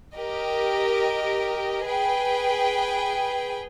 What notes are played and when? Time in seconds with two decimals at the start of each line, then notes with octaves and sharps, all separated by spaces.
0.16 G4 A#4 D#5
1.86 G#4 B4 G5